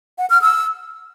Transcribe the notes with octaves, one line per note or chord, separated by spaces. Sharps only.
F#5
F6
E6